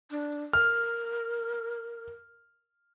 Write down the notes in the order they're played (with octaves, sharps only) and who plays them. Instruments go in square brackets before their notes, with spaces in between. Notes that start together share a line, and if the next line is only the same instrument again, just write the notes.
[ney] D4
[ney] A#4 [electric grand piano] F6